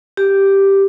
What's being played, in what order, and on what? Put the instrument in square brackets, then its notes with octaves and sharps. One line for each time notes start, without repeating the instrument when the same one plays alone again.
[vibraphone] G4